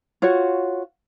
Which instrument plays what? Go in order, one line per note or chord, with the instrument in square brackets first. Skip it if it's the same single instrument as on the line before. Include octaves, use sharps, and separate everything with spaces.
[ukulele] F4 F#4 C#5